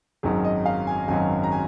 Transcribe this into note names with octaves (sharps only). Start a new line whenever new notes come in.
G#1 F#2 D#3 F#3 G#4
D#5
F5
G#5
G#1 F#2 D#3 F#3 G#5
A#5
G#5